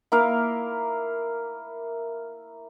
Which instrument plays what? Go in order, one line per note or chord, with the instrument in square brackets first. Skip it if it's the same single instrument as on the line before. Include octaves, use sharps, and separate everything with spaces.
[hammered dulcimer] A#3 E4 A#4 F5